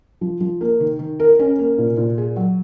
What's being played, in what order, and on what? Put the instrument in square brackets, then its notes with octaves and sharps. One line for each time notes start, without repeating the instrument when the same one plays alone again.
[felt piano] F3
F3
A#3
D#3
D#3
A#4
C#4
A#3
A#2
A#2
G#4
F#3